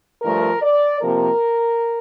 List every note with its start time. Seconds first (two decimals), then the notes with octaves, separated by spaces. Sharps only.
0.22 G2 F3 A3 A#4
0.62 D5
1.01 C3 F3 A#3 A#4